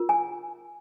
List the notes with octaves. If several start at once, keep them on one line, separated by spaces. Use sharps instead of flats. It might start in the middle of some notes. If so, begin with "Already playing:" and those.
Already playing: F4 A#4
G#5